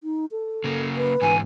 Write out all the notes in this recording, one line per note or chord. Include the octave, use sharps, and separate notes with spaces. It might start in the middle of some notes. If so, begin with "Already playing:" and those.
D#4
A4
C#3 A#3
B4
G#2 D3 E3 G#5